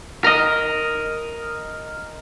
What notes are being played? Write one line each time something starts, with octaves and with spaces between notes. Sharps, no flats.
A#4 D#5